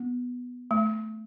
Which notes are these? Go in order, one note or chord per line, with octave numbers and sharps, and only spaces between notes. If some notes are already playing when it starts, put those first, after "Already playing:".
Already playing: B3
A3